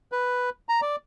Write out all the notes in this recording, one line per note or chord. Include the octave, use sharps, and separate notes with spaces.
B4
A#5
D5